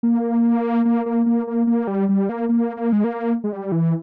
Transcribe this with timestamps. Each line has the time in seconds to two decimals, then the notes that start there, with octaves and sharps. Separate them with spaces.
0.03 A#3
0.85 A#3
1.06 A#3
1.26 A#3
1.47 A#3
1.67 A#3
1.87 G3
2.09 G3
2.29 A#3
2.49 A#3
2.77 A#3
2.93 G#3
3.04 A#3
3.44 G#3
3.53 G3
3.72 E3